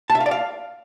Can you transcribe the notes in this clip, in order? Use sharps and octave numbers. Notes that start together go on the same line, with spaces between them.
A5
E5
F5
D5
F5